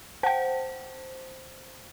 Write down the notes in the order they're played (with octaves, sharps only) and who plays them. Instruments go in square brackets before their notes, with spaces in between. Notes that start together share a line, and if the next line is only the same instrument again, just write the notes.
[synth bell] C5 [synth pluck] F#5 G5